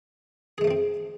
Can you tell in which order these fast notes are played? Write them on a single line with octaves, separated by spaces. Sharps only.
G#4 G#3 A3 F3 C4